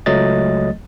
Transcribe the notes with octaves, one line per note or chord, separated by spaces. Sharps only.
C#2 F#3 A3 D#5 A6